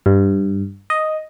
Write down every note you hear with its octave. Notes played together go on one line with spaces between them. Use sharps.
G2
D#5